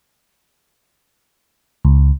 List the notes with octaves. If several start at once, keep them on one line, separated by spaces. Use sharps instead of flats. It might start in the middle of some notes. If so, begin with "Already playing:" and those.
C#2